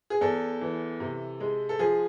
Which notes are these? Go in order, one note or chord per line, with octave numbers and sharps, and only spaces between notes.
G#4
E2 A4
E3
C3
G#3
A4
F3 G#4